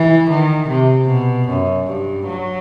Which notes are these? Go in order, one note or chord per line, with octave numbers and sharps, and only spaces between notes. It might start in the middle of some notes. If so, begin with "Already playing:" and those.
Already playing: E3
D#3
C3
B2
F#2
G2
F#3